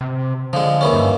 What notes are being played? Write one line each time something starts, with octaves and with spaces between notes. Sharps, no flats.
C3
D3 F3 G#3
D#2 E3 C#4
G2